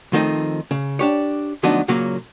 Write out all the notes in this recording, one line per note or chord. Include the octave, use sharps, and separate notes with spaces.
D#3 F3 A3 C4 D#4
C#3
D4 G4 C#5
D2 F3 F#3 B3 D4 D#4
A#2 C#3 F#3 A#3 C#4